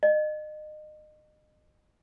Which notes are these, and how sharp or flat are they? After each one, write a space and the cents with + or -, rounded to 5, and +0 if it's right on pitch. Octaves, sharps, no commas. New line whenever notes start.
D#5 -30